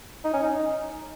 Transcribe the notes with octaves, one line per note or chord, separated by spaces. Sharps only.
D#4
C#4
D#4